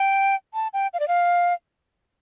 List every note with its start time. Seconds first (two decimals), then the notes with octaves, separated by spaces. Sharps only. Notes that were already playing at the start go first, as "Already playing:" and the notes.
Already playing: G5
0.54 A5
0.73 G5
0.94 F5
1.00 D5
1.08 F5